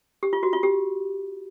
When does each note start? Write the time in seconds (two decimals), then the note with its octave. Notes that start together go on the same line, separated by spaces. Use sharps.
0.23 G4
0.33 F4
0.43 F#4
0.53 F4
0.63 G4